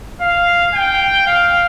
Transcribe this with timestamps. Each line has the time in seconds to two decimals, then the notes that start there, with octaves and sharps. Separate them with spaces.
0.21 F5
0.74 G5
1.27 F5